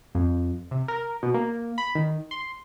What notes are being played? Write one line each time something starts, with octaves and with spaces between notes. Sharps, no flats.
F2
C3
A#4
B2
A#3
B5
D#3
C6